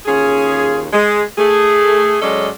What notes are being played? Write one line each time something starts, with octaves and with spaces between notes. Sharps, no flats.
D#2 C#4 F4 G#4
G#3
A3 G#4
F#3 G#3 C#4 A4 D5 D#5